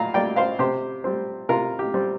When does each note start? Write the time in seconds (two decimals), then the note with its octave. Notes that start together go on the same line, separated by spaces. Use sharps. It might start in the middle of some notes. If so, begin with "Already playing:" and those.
Already playing: A#2 F5 A#5
0.14 G3 A#3 D5 G5
0.36 C5 F5
0.59 C3 G4 C5
1.04 G3 C4
1.49 C3 F4 A#4
1.79 G4
1.94 G3 C4